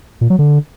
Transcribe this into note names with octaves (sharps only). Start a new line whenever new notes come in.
A#2
F#3
D3